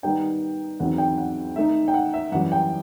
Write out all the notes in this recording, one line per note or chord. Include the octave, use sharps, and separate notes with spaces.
D#3 G3 B3 D#4 G5
E2 D#3 F#3 C4 F#5
G5
F#5
D#3 A3 D#4 E5
G5
F#5
E5
F#2 E3 G3 F#5
G5